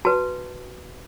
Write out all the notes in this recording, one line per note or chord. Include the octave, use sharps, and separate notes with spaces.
F#4 B4 A5